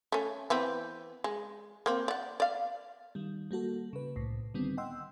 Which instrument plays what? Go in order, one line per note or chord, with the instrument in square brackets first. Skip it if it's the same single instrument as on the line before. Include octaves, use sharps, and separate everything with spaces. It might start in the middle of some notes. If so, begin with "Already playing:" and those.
[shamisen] A3 C#4
E3 B3 C4
G#3
A#3 C4
D5 F#5
D5 F5
[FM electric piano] D#3 G3
G3 A#3 F#4 A4
C#3 B4
C2 A2
D3 D#3 G3 B3 C4
D#5 F#5 G5 C6 E6